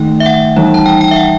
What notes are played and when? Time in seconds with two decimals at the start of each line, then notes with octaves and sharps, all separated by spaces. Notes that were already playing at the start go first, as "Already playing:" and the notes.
Already playing: D#3 A3 D#4 G5
0.20 E5
0.26 F#5
0.56 E3 G3 D#4
0.74 A5
0.86 G5
1.01 G5
1.11 E5
1.16 F#5